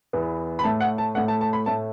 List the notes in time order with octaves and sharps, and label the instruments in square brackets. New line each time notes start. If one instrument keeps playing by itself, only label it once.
[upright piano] E2 E3 B3
B5
A2 A3 A5
F#5
A5
A2 A3 F#5
A5
A5
B5
A2 A3 A5